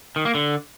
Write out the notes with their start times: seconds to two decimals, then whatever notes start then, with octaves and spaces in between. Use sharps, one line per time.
0.16 D#3
0.25 A#3
0.35 D3